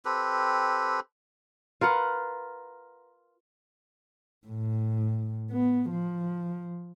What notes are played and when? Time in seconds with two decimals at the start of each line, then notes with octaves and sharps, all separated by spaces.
0.05 C4 G4 A4 B4
1.81 F4 A#4 B4 F#5
4.48 A2
5.51 B3
5.91 F3